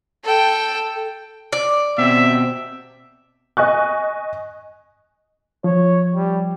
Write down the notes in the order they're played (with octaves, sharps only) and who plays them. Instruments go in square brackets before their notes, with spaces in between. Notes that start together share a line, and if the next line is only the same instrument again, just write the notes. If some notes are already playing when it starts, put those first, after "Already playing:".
[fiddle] A4 G5
[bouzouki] D5
[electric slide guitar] B2 C4 [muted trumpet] E5
[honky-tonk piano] D#5 G#5 C#6 F#6
[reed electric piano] F3 [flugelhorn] C#5
[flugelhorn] G3